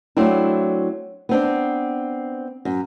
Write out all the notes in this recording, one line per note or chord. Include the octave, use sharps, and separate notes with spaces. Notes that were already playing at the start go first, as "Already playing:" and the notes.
F#3 A3 C4 D4 E4
B3 C4 D4
F#2